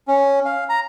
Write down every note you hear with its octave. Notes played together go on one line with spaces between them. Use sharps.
C#4
F5
A#5